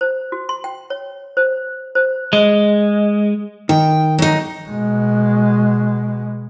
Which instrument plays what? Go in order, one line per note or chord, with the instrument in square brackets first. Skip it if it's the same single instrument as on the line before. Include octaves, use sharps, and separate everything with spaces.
[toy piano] C5
F#4
C6
G5
C#5
C5
C5
[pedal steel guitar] G#3
[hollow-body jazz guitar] D#3 [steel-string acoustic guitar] G5
[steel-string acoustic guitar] F#3 D#4
[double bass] B2 G#3